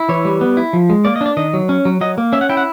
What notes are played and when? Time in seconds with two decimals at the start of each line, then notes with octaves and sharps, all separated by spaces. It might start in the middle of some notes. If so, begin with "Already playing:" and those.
Already playing: E4
0.09 E3 C#5
0.25 G3
0.41 B3
0.57 E4
0.73 F3
0.90 G#3
1.05 A#3 D5
1.16 D#5
1.21 D4 D5
1.37 D#3 D#5
1.53 F#3
1.69 C#4
1.85 F#3
2.01 F#3 D#5
2.18 A#3
2.33 C#4 E5
2.41 F#5
2.49 E4 G5
2.57 F#5